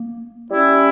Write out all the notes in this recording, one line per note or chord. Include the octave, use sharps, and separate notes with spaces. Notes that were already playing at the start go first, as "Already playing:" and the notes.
Already playing: A#3
G3 C#4 E4